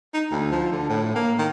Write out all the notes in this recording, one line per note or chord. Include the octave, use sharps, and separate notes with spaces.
D#4
D2
F3
D3
A2
A#3
D#3